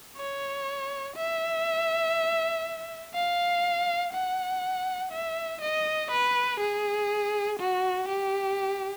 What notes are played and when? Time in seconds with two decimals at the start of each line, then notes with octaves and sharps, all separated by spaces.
0.17 C#5
1.16 E5
3.14 F5
4.13 F#5
5.12 E5
5.61 D#5
6.11 B4
6.60 G#4
7.59 F#4
8.09 G4